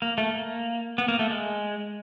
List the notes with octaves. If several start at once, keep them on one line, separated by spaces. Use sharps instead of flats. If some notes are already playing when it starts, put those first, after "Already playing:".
A#3
A3
A#3
B3
A#3
A3
G#3